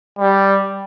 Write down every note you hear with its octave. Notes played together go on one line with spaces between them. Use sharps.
G3